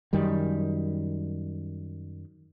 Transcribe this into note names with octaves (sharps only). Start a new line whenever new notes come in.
F#2 D#3 G3